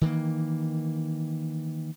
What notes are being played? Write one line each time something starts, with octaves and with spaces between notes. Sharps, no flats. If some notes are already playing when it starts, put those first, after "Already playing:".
D#3 E3 A#3